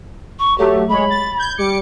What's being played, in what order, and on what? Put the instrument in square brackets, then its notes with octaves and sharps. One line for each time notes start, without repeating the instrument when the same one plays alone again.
[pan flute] C#6
[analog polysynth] F#3 A3 [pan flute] G4
[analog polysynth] G#3 C#5 [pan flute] B5
[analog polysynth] A6
G6 G#6
G3 D6 C#7